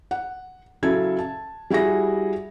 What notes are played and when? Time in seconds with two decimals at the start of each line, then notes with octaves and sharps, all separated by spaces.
0.11 F#5
0.83 C#3 F#3 E4 A4 G#6
1.19 A5
1.70 G3 E4 F#4 G#4 A#6